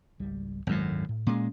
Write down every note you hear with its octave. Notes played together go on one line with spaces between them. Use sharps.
G#1 C#2 G3
D1 G#1 F#2 A2 F#3 G#3
A2
A#2 G#3 C#4